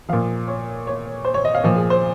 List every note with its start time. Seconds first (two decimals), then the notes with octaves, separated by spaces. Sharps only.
0.09 A#2 F3 F5
0.48 C#5
0.87 C#5
1.25 C5
1.34 C#5
1.45 D#5
1.55 F5
1.64 A#2 F3
1.76 G#4
1.90 C5